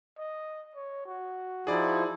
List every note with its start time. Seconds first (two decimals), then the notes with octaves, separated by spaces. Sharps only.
0.18 D#5
0.75 C#5
1.06 F#4
1.67 F3 D#4 E4 G#4 D5